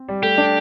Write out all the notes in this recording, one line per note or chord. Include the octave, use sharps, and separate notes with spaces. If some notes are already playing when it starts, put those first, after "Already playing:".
Already playing: C4
G3
A3 G4
D4